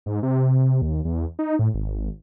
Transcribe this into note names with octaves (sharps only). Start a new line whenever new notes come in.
G#2
C3
C3
D#2
E2
D#4
A2
G#1